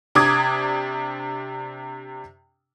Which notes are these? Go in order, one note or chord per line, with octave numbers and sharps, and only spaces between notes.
C3 D4 A#5 D6 D#6 G#6